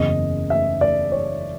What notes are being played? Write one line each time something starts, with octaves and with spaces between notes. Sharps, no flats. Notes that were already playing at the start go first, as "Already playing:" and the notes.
Already playing: F#1 E2 C#3 D#5
E5
D5
C#5